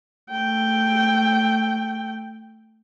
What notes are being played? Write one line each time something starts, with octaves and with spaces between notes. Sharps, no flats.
A3 G5